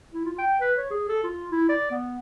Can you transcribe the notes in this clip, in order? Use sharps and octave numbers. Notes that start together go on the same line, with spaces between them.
E4
F4
G5
B4
C#5
G#4
A4
F4
E4
D5
B3